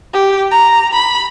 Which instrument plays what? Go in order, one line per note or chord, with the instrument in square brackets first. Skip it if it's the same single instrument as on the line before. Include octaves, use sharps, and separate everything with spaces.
[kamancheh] G4
A#5
B5